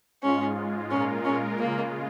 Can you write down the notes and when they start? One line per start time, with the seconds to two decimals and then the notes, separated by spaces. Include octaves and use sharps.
0.23 G#2 G#3 C#4 F4
0.91 A#2 G#3 C#4 F4 A#4
1.25 C#4
1.59 C#3 G#3 A#3 F4